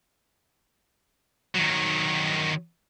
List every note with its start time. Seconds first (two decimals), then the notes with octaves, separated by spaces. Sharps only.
1.55 D#3 F#3